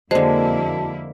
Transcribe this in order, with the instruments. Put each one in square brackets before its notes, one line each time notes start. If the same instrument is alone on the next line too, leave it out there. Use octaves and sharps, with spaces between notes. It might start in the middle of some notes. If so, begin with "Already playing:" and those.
[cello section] F2 A#3 E4 [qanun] D3 G#3 [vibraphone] F#4 A5 [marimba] C5